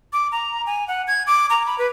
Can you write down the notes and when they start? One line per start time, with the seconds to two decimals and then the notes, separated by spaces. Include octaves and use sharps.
0.13 D6
0.32 A#5
0.66 G#5
0.88 F#5
1.08 G#6
1.27 D6
1.50 A#5
1.66 B5
1.78 B4